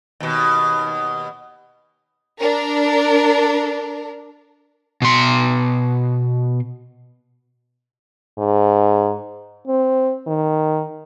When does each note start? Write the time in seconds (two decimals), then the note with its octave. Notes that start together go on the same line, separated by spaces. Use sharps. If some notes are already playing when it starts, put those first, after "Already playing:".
0.20 D#2 B2
2.38 D4 A#4
5.02 B2 C6
8.38 G#2
9.67 C4
10.27 D#3